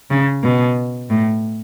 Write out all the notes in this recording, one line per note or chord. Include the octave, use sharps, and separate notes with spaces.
C#3
B2
A2